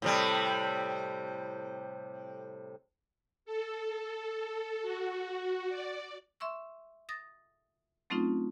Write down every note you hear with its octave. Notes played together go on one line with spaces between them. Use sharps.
A2 C3 G3
A4
F#4
D5
E5 C6 C#6 E6
D#6 A6 A#6
F#3 A3 C4 C#4 D#4 F4